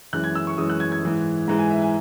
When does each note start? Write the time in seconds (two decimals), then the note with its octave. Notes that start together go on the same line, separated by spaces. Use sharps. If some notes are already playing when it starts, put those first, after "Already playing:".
0.13 F#2 E3 G#3 F#6
0.24 G#6
0.35 E6
0.47 C#6
0.58 F#2 E3 G#3 D#6
0.70 F#6
0.80 G#6
0.92 G#6
1.03 G#2 E3 G#3
1.48 G#2 E3 G#3 A#5
1.59 G#5
1.70 E5
1.82 G#5